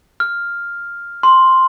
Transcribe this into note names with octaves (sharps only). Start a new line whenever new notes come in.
F6
C6